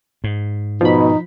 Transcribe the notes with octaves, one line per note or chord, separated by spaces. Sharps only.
G#2
B2 F3 D#4 B5